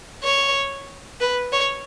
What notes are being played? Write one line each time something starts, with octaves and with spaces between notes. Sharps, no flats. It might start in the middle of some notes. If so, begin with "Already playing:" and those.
C#5
B4
C#5